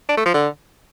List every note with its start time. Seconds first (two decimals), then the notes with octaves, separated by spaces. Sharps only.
0.09 D4
0.17 A3
0.26 F3
0.34 D3